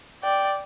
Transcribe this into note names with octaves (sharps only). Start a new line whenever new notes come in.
D5 G5